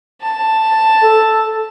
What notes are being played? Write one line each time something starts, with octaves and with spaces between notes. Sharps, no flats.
A5
A4